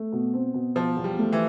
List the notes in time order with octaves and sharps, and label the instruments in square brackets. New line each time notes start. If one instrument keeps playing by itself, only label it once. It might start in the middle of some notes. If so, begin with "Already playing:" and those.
Already playing: [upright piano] A3
B2
C4
B2
[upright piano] B2 [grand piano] F3
[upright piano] E2
[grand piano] G3
[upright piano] A3
[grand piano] E3